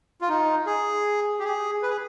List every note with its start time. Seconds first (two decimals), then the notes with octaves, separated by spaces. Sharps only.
0.21 F4
0.28 D#4
0.66 G#4
1.39 G4
1.44 G#4
1.82 B4
1.89 G#4